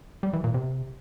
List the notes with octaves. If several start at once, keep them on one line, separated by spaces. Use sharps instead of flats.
G3
E3
A#2
C3